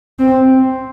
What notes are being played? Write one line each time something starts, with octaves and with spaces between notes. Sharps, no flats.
C4